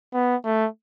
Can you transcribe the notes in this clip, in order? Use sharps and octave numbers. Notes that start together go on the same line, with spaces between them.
B3
A3